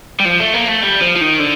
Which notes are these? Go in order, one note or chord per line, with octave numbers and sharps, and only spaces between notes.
G3
F3
A3
A#3
A3
G3
F3
F3
D#3
D3